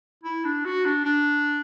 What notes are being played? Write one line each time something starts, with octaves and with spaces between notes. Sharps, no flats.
E4
D4
F#4
D4
D4